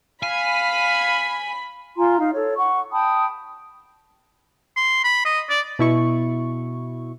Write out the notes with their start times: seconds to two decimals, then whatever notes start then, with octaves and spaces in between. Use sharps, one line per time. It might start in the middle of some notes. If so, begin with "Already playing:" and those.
0.23 F5 G#5 B5
1.97 F4 G#5 A#5 C6
2.19 D#4 F5
2.33 A4 C#5
2.57 F#5 C#6
2.91 G5 A5 B5 D#6
4.77 C6
5.04 B5
5.25 D#5
5.50 D5
5.79 B2 E4 C#6